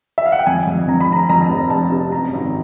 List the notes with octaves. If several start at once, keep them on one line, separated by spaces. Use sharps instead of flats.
E5
F5
F#5
G5
F2 G#5
F2
F2 A#5
B5
F1 A#5
F2 A#5
A5
F1 A#5
F1 A5
C3
F#2 A#5
G#1